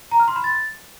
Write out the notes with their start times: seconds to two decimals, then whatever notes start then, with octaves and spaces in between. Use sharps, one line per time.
0.11 A#5
0.20 F6
0.28 C6
0.36 B5
0.44 A6